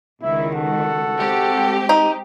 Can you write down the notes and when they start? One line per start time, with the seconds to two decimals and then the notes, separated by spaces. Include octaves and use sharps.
0.22 C#2 D#3 E4
0.55 F#4 A4 F#5
1.16 G#3 C4 G4
1.89 D#4